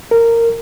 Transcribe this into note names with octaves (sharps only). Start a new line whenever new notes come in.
A#4